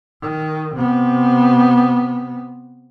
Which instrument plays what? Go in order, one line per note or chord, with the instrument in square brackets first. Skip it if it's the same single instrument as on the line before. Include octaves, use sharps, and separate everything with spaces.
[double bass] D#3
C3 B3